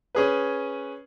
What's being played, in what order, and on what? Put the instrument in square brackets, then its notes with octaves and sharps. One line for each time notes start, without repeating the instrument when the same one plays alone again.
[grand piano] C#4 G#4 B4